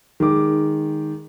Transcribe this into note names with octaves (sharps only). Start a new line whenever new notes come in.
D#3 G#3 D6